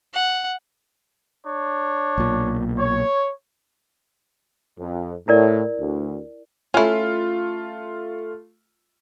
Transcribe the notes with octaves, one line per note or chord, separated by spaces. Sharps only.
F#5
D4 C#5
B1 A#2
C#5
F2
A2 E4 A#4 D5
D2
A3 C#4 E4 F4